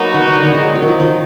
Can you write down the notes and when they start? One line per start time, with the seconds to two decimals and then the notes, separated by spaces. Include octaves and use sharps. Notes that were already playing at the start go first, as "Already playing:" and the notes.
Already playing: F#3 A#3 B3 D#4 F#4
0.14 D#3
0.27 D#3
0.36 D3
0.45 D#3
0.54 G#3
0.64 F#3
0.75 F#3
0.82 D#3
0.88 F3
1.00 D#3